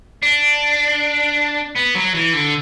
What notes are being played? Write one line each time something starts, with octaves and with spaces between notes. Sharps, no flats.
D4
B3
F#3
E3
D3